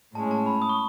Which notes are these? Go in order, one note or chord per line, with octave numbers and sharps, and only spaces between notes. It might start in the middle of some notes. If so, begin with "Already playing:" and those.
A2 G#3 C#4 A5
A5
B5
D#6
C#6